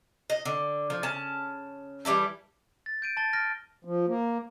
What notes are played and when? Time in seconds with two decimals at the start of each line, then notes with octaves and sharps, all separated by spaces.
0.30 D#5
0.45 D3
0.90 F3
1.03 C#3 C#4 A5
2.05 E3 G3 E4 A4
2.86 A6
3.02 G6 D7 D#7
3.17 A5 A6 G7
3.33 F6 A6 A#6 D7
3.85 F3
4.08 A#3